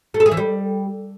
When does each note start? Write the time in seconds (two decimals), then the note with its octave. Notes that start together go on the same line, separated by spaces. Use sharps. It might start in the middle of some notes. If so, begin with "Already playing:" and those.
0.14 A3
0.20 A4
0.26 G#4
0.31 E3
0.37 G3